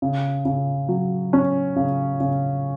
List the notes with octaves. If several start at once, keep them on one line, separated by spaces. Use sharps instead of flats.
C#3
C#3
F#3
C#4
C#3
C#3